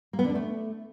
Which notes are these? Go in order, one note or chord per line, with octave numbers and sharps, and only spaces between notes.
A#3
B3
D3
D4
A3